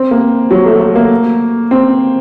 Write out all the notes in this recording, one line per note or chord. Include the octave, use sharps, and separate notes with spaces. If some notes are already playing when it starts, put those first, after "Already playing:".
Already playing: C4
A#3
F#3
A3
A3
A#3
C4